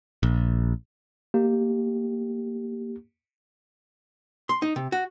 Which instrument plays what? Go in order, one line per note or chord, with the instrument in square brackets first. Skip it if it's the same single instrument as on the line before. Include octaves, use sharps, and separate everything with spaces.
[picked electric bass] A#1
[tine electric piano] A#3 G4
[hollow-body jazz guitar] C6
D#4
C3
F#4